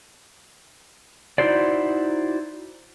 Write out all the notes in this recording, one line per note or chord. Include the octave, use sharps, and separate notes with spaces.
D#4 E4 F#4 C5 D5